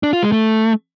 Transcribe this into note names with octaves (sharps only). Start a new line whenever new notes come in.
D4
F4
G#3
A3